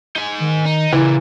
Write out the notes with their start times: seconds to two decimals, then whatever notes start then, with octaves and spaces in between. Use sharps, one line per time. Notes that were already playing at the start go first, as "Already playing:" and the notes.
0.16 D#4 G#5
0.40 D#3
0.66 D#4
0.93 A#2 C#3 E3